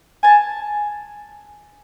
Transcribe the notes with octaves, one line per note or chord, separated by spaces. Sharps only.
G#5 A5